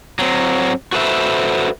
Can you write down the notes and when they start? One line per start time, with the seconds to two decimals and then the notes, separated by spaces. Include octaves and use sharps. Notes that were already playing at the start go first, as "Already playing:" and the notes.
0.19 F#3 C4
0.93 F#4 A4 B4 C5 E5